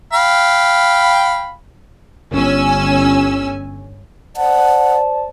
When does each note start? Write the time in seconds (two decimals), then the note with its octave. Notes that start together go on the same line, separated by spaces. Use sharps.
0.13 F5 G5 B5
2.33 G1 C#4 G#5 E6
4.37 C5 D5 F#5 A5